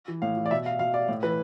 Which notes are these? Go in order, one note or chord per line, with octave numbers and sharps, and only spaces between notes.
E3
A2 F5
E3
D5
B2 E5
F5
B2 F5
D5
A2 D5
E3 B4